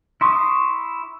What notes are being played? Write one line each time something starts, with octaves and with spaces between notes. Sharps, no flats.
E4 C6 C#6 D#6